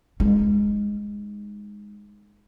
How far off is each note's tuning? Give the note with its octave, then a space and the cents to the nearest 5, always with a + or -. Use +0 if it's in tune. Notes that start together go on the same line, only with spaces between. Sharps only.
G#3 -10 D#4 +0